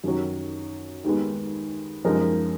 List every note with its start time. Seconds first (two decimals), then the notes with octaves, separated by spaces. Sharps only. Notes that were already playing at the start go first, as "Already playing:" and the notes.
0.04 F#2 D#3 F#3
1.04 D#2 D#3 G#3 B3
2.04 F#2 F3 G#3 D#4 A#4